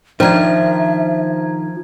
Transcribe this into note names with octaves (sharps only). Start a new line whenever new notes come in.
D#3 F3 D4 C5 E5 A#5 G#6